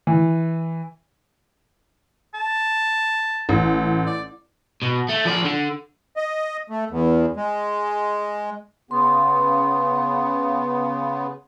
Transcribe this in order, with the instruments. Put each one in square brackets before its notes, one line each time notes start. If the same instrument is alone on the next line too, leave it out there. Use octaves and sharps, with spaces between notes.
[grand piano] E3
[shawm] A5
[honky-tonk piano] A1
[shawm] D5
[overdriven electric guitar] B2
A3
F3 D5
D3
[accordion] D#5
A3
E2
G#3
[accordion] C#3 B3 [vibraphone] C6